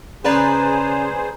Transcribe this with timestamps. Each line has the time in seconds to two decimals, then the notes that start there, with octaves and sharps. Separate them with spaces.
0.25 C#3 G#4 B4 C5 D5 A#5 B5